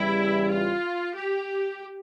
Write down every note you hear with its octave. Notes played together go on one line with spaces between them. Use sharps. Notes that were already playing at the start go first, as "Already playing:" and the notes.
Already playing: E2 C#3 E3 G3 E4
F4
G4